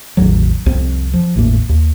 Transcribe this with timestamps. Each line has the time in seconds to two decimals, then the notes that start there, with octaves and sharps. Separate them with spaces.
0.17 A1 E2 D#3 F#3
0.66 C2 F2 C4
1.14 F3
1.36 G#1 E2 A2 A#3
1.69 D#2